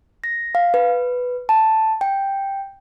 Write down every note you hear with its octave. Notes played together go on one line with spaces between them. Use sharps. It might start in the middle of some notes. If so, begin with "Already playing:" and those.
A#6
F5
B4
A5
G5